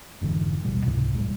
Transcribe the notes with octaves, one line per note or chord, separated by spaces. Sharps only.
F1 G#2 D3 E3
D#1 A1 B2 G3
C#2 G#2 C3
E1 A2 G3 G#3